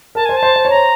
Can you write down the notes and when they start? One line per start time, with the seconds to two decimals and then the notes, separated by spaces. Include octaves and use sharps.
0.15 A#4 A5
0.26 C5 G#5
0.37 A5
0.43 C5
0.56 C5
0.65 C#5
0.70 C5 A#5